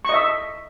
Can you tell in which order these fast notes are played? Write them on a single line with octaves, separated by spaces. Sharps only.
C#6 D#5 E5